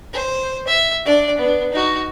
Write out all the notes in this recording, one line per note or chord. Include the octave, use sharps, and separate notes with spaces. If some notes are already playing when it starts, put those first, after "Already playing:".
C5
E5
D4 D5
B3 D4
D#4 F#4